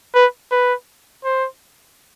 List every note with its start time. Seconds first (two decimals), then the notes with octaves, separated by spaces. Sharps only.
0.15 B4
0.51 B4
1.24 C5